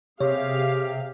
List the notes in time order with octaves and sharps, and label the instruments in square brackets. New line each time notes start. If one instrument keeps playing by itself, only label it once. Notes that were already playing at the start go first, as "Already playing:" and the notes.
[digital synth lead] C3 [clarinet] G4 [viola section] G#4 F5 [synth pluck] C#5